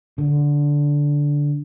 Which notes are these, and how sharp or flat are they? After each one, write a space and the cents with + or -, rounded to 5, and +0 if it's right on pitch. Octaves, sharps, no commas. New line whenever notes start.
D3 -10